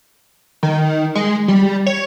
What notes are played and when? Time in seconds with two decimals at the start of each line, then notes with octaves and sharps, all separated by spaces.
0.63 D#3
1.15 G#3
1.48 G3
1.87 C#5